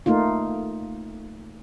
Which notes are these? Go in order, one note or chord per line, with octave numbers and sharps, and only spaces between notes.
A3 A#3 D#4 F4